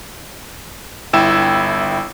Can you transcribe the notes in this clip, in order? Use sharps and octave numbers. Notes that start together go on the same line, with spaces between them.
G1 E4 G5 E6 E7